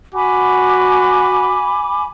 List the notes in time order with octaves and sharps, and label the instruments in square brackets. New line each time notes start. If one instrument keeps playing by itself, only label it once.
[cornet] F#4 [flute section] G#5 B5 D6